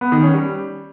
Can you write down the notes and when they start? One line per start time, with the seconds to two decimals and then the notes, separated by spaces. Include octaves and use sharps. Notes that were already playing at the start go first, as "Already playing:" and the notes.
0.01 B3
0.12 D#3
0.23 C#4
0.34 G3